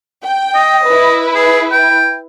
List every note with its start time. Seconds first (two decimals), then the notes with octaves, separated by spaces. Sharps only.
0.24 G5
0.55 D#5
0.87 E4 B4
1.35 G#4
1.72 G5